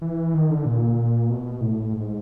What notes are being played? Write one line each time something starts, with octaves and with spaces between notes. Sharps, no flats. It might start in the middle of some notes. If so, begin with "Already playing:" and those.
E3
D#3
D3
A#2
B2
A2
G#2